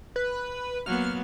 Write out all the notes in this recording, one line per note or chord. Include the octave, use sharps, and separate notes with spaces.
B4
F#3 A#3 B3 F6